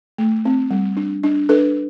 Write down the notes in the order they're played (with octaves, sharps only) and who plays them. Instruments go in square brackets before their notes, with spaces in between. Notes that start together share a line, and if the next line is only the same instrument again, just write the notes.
[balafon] A3
C4
G3
D4
D4
D4 A4 B4